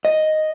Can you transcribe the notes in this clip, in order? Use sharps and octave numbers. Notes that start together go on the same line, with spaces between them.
D#5